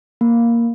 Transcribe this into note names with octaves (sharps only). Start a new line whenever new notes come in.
A#3